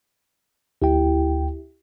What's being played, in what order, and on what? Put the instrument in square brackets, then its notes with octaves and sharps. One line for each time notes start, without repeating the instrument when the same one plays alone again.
[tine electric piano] D2 G5 [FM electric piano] E4 G4